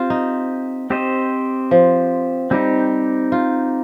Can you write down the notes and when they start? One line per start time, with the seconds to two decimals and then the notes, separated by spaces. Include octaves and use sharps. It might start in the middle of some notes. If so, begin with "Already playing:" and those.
Already playing: C4 F4 G4 C5
0.10 D#4
0.90 C4 G4 C5 D#5
1.71 F3
2.51 G3 C4 D#4 G4
3.32 F4